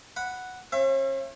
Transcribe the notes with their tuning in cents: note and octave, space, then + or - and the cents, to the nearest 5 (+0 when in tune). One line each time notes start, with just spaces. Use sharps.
F#5 +0 B5 +0
C#4 -45 E5 +35